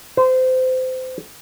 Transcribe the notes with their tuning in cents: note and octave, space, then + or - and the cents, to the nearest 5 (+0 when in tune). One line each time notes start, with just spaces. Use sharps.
C5 -25